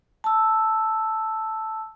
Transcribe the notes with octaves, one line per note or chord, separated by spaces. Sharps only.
A5 E6